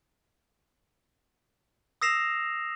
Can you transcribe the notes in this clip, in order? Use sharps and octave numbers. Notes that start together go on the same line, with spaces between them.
D#6 E6 A#6 C7 E7 F7